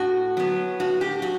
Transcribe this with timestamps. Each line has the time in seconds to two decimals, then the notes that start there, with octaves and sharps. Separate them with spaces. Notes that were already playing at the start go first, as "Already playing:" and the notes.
Already playing: A2 F#4
0.37 F#3 B3
0.80 A2 F#4
1.01 G4
1.22 F#3 F#4